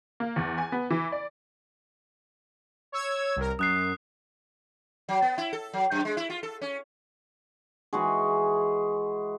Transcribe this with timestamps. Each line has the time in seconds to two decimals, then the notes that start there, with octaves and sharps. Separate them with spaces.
0.20 A#3
0.36 E2
0.58 G#5
0.72 B3
0.90 E3
1.12 D5
2.92 C#5 E6 G#6
3.36 C2 A#4
3.59 F#2 D#6 F#6 C7
5.09 F#3
5.22 B3
5.38 E4
5.53 A4
5.73 F#3
5.91 F#2
6.05 G#3
6.17 E4
6.30 F4
6.43 A4
6.61 C#4
7.93 E3 G#3 F#4 G#4